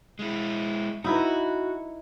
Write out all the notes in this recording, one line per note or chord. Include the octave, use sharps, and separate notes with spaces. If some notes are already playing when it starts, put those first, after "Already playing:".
G#3 E4
D#4 E4 F#4 B4